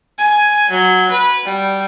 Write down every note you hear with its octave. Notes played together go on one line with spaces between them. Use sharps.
G#5
F#3
B4
G3